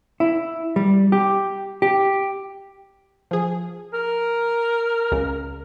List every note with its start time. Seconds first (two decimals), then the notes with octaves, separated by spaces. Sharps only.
0.20 E4
0.76 G3
1.12 G4
1.82 G4
3.31 F3 G#4
3.93 A#4
5.12 C#2 C#3